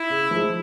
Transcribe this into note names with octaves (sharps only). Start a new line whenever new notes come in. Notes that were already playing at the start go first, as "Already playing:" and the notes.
Already playing: E4
C#3
F3 G#3